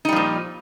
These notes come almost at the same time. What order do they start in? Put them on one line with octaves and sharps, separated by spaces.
D#4 G3 F3 A#2